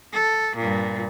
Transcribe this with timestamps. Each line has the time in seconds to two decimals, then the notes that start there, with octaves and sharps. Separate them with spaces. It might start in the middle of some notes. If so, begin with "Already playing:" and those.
0.12 A4
0.56 G2 A#2